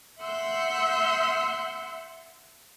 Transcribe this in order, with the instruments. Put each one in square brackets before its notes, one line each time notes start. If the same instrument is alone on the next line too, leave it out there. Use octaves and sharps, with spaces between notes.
[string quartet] E5 F#5 C6 E6 F#6 G6